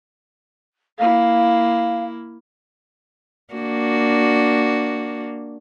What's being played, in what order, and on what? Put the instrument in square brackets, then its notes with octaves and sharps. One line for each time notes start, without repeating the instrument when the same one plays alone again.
[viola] A#3 E4 [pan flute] F5
[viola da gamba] A#3 D4 F#4